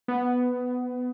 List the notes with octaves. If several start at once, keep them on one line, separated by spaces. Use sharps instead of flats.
B3